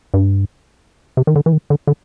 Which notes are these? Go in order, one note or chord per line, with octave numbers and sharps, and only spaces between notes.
G2
C3
D#3
D3
E3
D#3
D3
D3